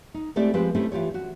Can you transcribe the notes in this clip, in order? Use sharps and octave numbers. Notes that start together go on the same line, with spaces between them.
D#4
G#3 A3 C4 E4 G4 D5
F3 G#3 C4 G4 B4
A3 C4 C#4 E4 G4
E3 F4 G4 C#5
F#4